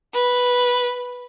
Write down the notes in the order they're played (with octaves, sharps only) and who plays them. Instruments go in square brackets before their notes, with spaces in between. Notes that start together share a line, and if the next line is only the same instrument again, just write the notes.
[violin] B4